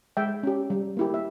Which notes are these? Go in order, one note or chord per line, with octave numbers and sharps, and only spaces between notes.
G#3 E5 G5
C#4 G4
G3
A#3 E4 G4
E5